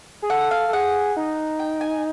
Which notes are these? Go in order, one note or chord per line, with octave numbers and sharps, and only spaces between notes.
G#4
A4 F#5
F5
A4
G#4 F#5
D#4
G5
G#5